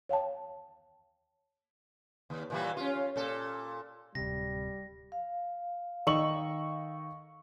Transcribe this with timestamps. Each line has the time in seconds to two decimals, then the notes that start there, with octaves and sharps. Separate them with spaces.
0.09 C#5 F5 G5 A5
2.30 D#2
2.50 A#2 E3 G3
2.77 C#4 F4
3.16 A#2 A4
4.15 D1 C3 G3 A#6
5.12 F5
6.07 D#3 D#5 C#6 E6 F#7